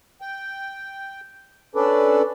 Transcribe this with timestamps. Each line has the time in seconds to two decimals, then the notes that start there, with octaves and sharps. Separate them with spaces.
0.21 G5
1.75 C#4 D4 A4 B4 D5